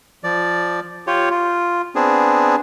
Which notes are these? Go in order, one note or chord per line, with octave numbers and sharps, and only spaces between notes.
F3 D5
F4 G4 C#5
F4
B3 C4 D4 G#4